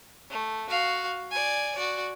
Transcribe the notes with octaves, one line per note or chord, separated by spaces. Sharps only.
A3
F#4 F5
D5 G#5
F#4 D5